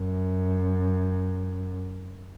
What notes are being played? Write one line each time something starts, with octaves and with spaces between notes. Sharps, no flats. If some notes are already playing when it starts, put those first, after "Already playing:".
Already playing: F#2